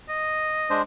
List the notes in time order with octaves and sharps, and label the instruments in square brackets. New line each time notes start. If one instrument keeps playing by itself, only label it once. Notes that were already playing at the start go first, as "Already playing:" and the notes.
[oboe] D#5
[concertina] G#3 D4 C5